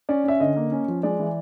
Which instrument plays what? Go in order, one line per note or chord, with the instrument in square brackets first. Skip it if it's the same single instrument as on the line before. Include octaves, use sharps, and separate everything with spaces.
[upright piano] C#4 D5
C#4 E5
D3 D#5
A#3
C#4
F3
G#3 D5
E3